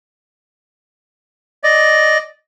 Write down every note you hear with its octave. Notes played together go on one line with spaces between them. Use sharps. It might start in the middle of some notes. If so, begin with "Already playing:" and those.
D5 D#5